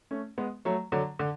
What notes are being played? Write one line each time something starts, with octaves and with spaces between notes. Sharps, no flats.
A3 C#4
G#3 B3
F#3 A3
D3 F#3
D3